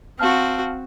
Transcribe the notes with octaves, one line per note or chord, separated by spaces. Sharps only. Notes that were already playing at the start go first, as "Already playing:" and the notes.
C4 F#4 F5 A5 F6